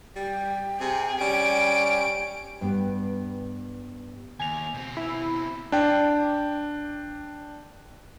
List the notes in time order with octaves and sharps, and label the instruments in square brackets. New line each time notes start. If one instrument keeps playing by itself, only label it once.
[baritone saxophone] G3 [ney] G5
[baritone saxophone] C3 [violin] G#4
[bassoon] G3 [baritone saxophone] C#4 [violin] D7
[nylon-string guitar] G2 B3
[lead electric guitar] D#2 [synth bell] G#5 F7
[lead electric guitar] B2 C4
[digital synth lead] E4
[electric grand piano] D4 G5